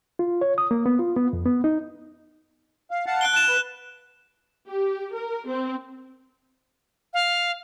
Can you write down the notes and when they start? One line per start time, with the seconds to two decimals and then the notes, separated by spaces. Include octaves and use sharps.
0.19 F4
0.41 C#5
0.58 D#6
0.71 A#3
0.86 B3
0.99 F4
1.16 B3
1.33 F2
1.45 B3
1.64 D#4
2.91 F5
3.06 F5 F#5 A5
3.21 F#6 D7 G7
3.34 A5 F#6 E7
3.48 B4
4.68 G4
5.13 A#4
5.48 C4
7.14 F5